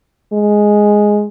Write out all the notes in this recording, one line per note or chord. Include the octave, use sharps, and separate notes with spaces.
G#3